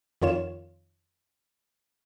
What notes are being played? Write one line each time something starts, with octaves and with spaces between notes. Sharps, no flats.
F2 D#3 F4 C#5 E7